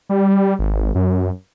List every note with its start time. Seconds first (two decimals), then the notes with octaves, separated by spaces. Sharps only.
0.09 G3
0.59 G#1
0.95 F#2